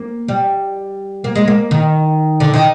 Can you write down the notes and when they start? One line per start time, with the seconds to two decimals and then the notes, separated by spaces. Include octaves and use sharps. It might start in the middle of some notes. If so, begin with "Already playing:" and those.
Already playing: A#3
0.28 G3
1.24 A#3
1.35 G#3
1.48 A#3
1.71 D#3
2.40 D3
2.54 D#3